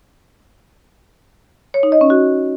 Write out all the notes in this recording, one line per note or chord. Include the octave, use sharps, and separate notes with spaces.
C#5
D#4
D#5
C#4
F#4